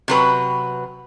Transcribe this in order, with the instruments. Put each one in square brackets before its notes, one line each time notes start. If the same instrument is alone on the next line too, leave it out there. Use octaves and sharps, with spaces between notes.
[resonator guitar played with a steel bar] C3 F#3 B4